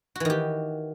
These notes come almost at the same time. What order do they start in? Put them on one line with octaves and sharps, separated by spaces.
F#4 E3 D#3 G4